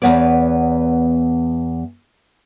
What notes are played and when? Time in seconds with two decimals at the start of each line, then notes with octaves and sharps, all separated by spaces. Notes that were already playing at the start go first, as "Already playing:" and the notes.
0.02 E2 D#3 B3 C#5 D5